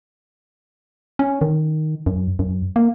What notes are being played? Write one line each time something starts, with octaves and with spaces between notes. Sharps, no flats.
C#4
D#3
F#2
F#2
A#3